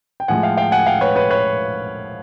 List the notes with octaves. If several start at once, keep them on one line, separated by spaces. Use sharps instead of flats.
G5
A2 F3 G#3 F#5 G#5
F5 G5
F5 G5
F#5 G#5
F5 G5
B4 C#5
B4 C#5
B4 C#5